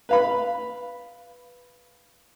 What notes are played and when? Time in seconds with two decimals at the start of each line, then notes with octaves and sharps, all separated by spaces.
0.09 B4 F5 B5